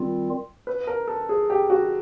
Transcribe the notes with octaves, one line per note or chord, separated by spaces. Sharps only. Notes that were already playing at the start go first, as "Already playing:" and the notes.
Already playing: D#3 G3 C4 F4
B4
A#4
A4
G#4
G4
F#4